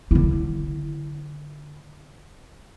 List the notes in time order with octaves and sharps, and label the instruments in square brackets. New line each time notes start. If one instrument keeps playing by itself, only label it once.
[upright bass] D3 E4